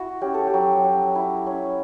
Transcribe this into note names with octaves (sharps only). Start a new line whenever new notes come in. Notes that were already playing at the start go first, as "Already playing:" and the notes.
Already playing: E4 F#4
C#4 G4
A4
G4
F#3
F#3
E4
C#4